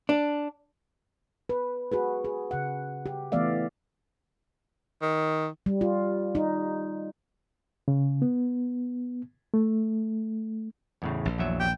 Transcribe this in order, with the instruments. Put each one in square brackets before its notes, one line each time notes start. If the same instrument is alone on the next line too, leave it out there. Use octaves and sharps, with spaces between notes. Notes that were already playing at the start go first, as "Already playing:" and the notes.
[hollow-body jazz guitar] D4
[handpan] B4
F#4 G#4 B4
G#4
C#3 F#5
G4
E3 A3 B3 D5 E5 F5
[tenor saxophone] D#3
[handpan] G3
F4
D#4
[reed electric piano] C#3
B3
A3
[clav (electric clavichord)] E2 A2 C#3
[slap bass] A#1
[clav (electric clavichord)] E2 F#3 E5
[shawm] G5